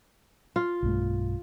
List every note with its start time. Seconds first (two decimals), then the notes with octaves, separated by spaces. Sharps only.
0.56 F4
0.83 B1 G2 A3